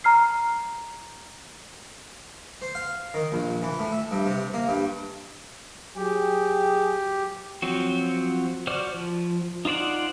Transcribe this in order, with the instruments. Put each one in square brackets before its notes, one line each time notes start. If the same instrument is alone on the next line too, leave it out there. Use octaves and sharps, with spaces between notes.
[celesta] A#5 F6 C7
[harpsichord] C5
F5
D#3
A#1
E3
A2
E5
G2
C3
A#3
G2
[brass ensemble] F#3 G#4 G5 [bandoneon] G4
[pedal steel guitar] F3 F#3 C4 F#4
F#4 C5 D5 F6
F3
D#4 F4 C5 D5 F#5